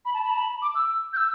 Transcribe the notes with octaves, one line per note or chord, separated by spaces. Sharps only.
B5
A5
B5
A5
B5
D6
E6
G6
E6